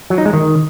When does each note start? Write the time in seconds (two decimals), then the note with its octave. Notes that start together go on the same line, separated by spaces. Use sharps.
0.10 F#3
0.18 D#4
0.26 G#3
0.33 D#3